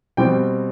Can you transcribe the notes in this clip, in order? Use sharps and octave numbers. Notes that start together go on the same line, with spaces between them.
B2 G3 C4 G5